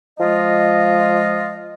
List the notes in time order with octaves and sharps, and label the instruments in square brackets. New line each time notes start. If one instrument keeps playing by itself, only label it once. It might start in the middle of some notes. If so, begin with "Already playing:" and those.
[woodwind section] F3 G#3 F4 D#5